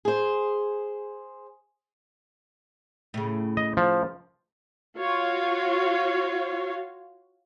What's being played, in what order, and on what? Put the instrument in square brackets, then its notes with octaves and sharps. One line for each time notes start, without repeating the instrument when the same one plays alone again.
[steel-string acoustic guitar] G#4 C5
[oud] A2 C#3
[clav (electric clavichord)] D#5
F3
[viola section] F4 F#4 C#5 F5